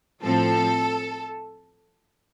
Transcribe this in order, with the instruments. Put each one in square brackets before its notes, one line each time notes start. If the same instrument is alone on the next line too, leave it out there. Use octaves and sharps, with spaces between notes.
[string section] A2 F3 C4 A4